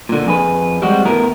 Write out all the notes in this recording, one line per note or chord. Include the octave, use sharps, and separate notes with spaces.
A#2 D3
F2 G#4 B4
G3 G#3 C4 F#4
E2 A2 B3 E4 A#4